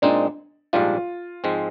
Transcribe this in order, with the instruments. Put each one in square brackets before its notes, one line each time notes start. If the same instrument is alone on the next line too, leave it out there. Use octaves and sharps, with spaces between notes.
[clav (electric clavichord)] A#2 G#3 C4 D#4 [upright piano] D4
[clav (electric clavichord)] A#1 G#2 G3 D4 [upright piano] F4
[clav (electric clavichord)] G#2 F3 G#3 C4